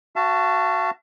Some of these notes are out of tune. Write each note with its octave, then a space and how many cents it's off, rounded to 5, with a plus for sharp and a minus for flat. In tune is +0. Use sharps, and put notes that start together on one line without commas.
F#4 +0 F5 -45 A5 +5